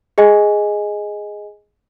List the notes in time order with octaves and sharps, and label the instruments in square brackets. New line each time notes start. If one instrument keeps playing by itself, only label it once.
[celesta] G#4 D#5 G#5